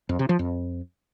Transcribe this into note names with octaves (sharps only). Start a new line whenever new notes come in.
F2
C3
F3
F2